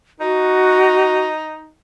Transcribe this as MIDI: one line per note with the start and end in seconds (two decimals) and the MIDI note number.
0.20 1.71 63
0.20 1.23 66